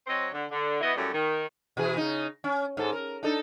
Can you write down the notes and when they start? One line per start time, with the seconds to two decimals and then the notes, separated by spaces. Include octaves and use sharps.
0.07 F#3 C4 C5 D#5
0.33 D3
0.51 D3
0.81 B2 B3 E4 D#5
0.96 F#2 A2 G3 A3
1.13 D#3
1.77 B2 E3 G#4
1.97 C#3 D#4
2.44 C#4
2.77 G#2 A4
2.92 A#4
3.23 D4 D#4 A4